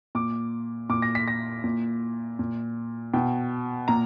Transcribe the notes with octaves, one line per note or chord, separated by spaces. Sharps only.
A#2 D6
A#2 D6
A#6
B6
A#6
A#2
A#2
B2 G5
A#2 A#5